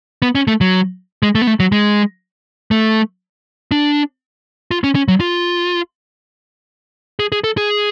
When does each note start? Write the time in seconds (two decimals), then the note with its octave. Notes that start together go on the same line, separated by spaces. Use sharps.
0.22 B3
0.35 C#4
0.48 A3
0.61 F#3
1.23 G#3
1.35 A3
1.42 B3
1.47 A3
1.60 F#3
1.72 G#3
2.71 A3
3.71 D4
4.71 F4
4.84 C#4
4.95 C#4
5.08 F#3
5.20 F4
7.19 G#4
7.32 G#4
7.44 A4
7.57 G#4